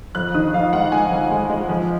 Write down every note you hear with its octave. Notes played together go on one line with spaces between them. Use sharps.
F2 F#6
D#3 D#6
F2 F5
G#3 F#5
G#3 G#5
F2
G#3
G#3
F3